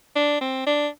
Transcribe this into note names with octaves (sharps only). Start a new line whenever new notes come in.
D4
C4
D4